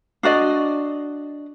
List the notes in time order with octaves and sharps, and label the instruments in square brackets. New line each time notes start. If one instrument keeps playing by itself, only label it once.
[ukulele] D4 F#4 D5 D#5